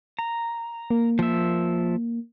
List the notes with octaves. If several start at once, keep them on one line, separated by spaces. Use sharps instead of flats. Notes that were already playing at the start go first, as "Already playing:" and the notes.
A#5
A#3
F3 E5